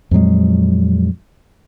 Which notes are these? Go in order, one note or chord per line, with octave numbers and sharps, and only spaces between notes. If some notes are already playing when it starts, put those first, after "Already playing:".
F2 A#2 F#3 G#3